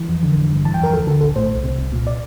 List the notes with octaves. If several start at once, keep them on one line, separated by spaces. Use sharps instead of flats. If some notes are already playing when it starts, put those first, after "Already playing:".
Already playing: E3
F2
D3
A1
G2
E3 A5
G5
F2
A#4
D2 A4
D3 A4
A#1 A4
A2 C5
C2
C3
C2
A#2
D5